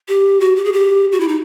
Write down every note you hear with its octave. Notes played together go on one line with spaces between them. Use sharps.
G4
F#4
G4
G#4
G4
F#4
E4
D#4